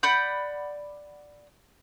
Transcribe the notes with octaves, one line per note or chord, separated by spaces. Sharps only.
D5 F#5 B5 G6